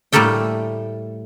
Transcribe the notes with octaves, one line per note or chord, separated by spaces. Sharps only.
A2 G3 A3 A#3 A4 G5